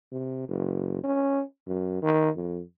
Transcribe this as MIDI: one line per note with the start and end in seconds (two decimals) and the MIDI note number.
0.12 0.45 48
0.48 1.02 30
1.04 1.42 61
1.67 2.00 42
2.02 2.30 51
2.36 2.61 41